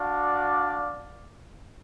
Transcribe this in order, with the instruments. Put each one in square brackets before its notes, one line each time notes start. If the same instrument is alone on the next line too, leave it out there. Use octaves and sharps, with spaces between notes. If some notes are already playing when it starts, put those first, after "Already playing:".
Already playing: [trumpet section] D4 F#4 D5 F5